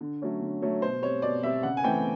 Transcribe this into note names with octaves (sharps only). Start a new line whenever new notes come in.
D3
F#3 A3 C#4
D3
F#3 A3 C#4
B2 C5
G3 C4 C#5
B2 D5
G3 C4 E5
C#3 F#5
G#5
E3 A3 C4 G5